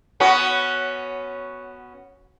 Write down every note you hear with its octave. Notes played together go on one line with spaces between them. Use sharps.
B3 C#4 F#4